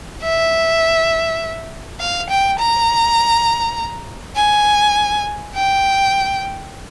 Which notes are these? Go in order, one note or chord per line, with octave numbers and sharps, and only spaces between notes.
E5
F5
G5
A#5
G#5
G5